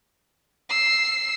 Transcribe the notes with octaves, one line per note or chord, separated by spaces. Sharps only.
E6 C7